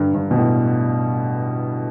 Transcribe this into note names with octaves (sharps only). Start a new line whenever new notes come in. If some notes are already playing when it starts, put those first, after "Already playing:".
Already playing: G2 D3
G2
B2
A2